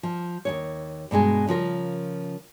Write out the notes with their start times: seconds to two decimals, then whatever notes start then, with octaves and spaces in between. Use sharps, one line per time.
0.03 F3
0.45 D#2 C#3 C#5
1.11 G2 B2 G#3 G#4
1.47 C#3 F3 F4 A#4